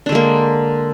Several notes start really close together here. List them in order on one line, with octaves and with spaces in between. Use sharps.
D4 D3 G#3 A#3